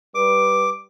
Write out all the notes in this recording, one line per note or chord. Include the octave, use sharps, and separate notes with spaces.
G3 B4 D6